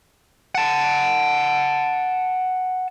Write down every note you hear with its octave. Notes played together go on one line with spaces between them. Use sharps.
F#5 A5